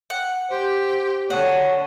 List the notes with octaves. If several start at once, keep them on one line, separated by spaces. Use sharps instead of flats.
F#5
G4 C5
D3 C#5 F#5